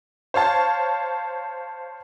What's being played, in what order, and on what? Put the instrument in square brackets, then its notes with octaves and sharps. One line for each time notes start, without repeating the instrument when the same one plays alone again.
[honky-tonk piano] C5 C#5 F5 A5